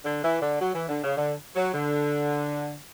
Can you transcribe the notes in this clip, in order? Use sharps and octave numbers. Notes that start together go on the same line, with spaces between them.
D3
E3
D3
F#3
E3
D3
C#3
D3
F#3
D3